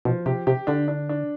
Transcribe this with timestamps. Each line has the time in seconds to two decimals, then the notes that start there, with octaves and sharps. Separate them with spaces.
0.05 B2 F3
0.26 C3 G4
0.47 C3 G4
0.67 D3 D4
0.88 D4
1.09 D4